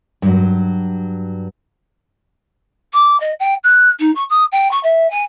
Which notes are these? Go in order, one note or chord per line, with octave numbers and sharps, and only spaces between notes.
G2 F#3
D6
D#5
G5
F#6
D#4
C#6
D#6
G5
C#6
E5
G#5